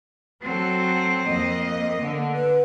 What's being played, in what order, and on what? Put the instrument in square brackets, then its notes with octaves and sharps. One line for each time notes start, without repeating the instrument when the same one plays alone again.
[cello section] F#3 A4 [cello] C4
[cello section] F2 D#5 [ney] A#3
[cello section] D3
[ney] B4